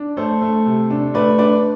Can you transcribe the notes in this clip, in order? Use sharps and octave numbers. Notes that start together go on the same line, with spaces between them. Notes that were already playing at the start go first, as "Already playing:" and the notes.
Already playing: D4
A3 A4 C5
A3
C3
D4
A3 B4 D5
D4 B4 D5